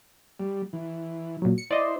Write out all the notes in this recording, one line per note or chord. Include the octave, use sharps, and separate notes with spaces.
G3
E3
A#2 F#3
C#7
E4 C5 D5 D#5